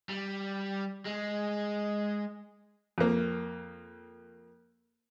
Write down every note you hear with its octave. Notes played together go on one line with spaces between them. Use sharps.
G3
G#3
F2 A#3